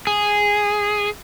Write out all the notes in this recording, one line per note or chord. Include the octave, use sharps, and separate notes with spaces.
G#4